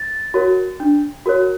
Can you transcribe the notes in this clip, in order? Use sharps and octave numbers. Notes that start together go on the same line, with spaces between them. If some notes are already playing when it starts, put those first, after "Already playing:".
Already playing: A6
F#4 A#4 C#5
D4
F#4 A#4 C#5